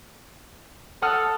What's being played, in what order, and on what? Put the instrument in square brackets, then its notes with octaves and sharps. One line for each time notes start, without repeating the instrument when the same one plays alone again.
[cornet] A4 [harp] F#5 D#6 F6